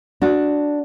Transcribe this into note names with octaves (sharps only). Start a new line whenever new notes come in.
D4 F#4